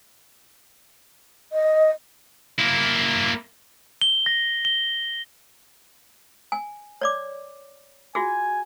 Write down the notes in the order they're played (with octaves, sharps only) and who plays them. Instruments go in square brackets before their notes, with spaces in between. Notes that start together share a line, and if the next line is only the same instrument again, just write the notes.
[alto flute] D#5
[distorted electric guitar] A#3 E4
[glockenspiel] G7
A#6
G7
[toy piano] G#5
C#5 D5 D6
[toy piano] F4 F#4 G#4 [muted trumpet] G#5